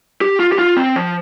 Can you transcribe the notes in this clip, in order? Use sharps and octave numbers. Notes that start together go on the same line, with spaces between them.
G4
F4
G4
F4
C4
F3